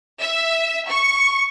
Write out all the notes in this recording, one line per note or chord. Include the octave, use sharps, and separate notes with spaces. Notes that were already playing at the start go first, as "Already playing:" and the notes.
E5
C#6